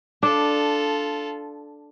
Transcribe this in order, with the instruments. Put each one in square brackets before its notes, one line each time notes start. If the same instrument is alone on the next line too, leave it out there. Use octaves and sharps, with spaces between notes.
[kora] D4 [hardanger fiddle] F4 A4